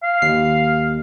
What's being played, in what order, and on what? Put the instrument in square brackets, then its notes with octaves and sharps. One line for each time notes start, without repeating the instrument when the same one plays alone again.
[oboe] F5
[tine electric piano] D#2 C7